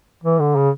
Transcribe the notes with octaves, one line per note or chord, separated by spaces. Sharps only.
E3
D3
C#3